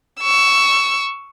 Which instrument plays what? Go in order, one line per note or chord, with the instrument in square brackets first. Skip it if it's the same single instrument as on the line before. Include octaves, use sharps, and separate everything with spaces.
[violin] C#6 E6